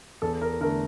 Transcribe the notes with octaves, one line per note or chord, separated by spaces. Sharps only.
E2 A4
A#4
D3 A3 A#4